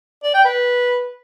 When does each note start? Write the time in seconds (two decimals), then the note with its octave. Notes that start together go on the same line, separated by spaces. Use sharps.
0.23 D5
0.34 G5
0.45 B4